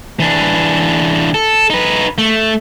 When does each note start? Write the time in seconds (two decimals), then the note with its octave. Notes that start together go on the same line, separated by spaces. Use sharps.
0.20 E3 D4
1.34 A4
1.70 D#4 B4
2.18 A3